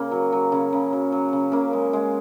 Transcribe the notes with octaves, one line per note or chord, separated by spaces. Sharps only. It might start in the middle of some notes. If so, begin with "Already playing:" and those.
Already playing: C#3 A#3
F#3
F#3
C#3
C#3
F#3
F#3
C#3
C#3 A#3
G#3
G#3